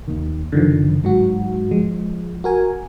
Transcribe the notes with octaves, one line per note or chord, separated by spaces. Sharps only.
D#2 D#3
F#1 D3 D#3 F3
G1 G#2 F#3 F#4
F3 G#3
F#4 A#4 G#5